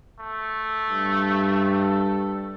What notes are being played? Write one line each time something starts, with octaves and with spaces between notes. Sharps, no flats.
A3
G2
A4